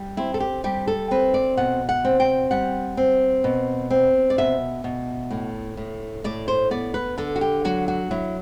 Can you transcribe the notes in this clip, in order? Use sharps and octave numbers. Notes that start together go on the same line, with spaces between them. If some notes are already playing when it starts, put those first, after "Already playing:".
Already playing: G3
C4 E4
A4
G4
G3 G4
A4
C4 B4
D5
B2 F#5
F#5
C4
G5
G3 F#5
C4
B2
C4
D5
B2 E5
B2
A2
A2
A2 D5
C5
B3 D5
B4
D3 A4
F#4
G4
F#3 F#4
F#4
F#3 E4